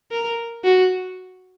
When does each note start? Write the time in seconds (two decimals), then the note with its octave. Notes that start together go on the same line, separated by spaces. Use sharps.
0.11 A#4
0.64 F#4